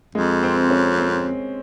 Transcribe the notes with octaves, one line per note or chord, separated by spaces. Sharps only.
F2 G#3
C4
C#4
C4